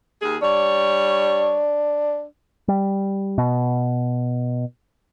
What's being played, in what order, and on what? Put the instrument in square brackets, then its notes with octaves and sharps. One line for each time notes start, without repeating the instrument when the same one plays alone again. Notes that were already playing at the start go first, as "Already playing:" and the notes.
[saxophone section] D#2 G#4
[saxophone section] G3 C#5 [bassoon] D4
[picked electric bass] G3
B2